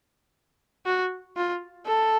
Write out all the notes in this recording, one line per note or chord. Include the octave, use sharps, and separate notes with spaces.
F#4
F4
A4